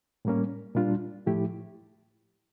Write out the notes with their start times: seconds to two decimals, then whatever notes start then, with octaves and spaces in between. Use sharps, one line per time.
0.25 A2 G3 A#3 C#4
0.75 A#2 G3 D4 F4
1.26 A2 F3 A3 E4 G4